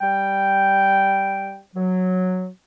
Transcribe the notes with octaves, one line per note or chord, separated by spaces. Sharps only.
G3 G5
F#3